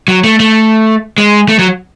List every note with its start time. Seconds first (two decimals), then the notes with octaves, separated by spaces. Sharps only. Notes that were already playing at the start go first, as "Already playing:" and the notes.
0.08 F#3
0.24 A3
0.40 A3
1.18 G#3
1.48 A3
1.59 F#3